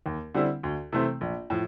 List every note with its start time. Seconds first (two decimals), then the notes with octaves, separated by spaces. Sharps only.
0.06 D#2
0.34 D3 G3 C4 E4
0.63 D2
0.92 C3 E3 A3 C4
1.21 A#1
1.50 A2 F3